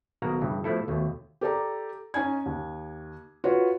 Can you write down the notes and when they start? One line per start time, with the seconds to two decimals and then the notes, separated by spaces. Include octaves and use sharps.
0.22 B1 B2 D#3 A#3 F#5 A#5
0.42 G2 C#3 E3
0.64 B2 F3 A3 E4 A4
0.88 D#2 B2 A3
1.41 G4 A4 D5 A#5
2.14 C#4 D#4 G#5 G#6
2.46 D#2
3.44 F4 F#4 B4 C#5